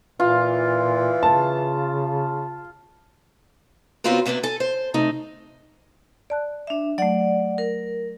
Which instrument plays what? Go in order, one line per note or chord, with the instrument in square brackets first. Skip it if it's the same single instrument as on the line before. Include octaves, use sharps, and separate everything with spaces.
[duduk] A#2 [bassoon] E3 [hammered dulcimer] F4
[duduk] C#3 [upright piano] A5
[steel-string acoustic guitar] C#3 B3 C4 F4 F#4 A#4
C3 A#3 B3 C#4 D4
A4 G#5
C5
C3 A3 D#4
[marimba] D5 A5 F#6
[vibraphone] D4 E5
[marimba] F#3 A3 [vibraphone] D5 F#5
[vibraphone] A#4